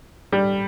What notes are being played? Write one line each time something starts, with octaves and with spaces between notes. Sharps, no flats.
G3